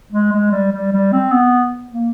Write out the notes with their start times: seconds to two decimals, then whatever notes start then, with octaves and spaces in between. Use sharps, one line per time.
0.12 G#3
0.32 G#3
0.51 G3
0.72 G3
0.92 G3
1.12 C4
1.32 B3
1.92 A#3